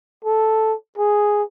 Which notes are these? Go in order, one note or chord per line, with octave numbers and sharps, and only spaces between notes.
A4
G#4